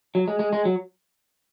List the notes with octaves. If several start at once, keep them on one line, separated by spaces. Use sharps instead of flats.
F#3
G#3
G#3
G#3
F#3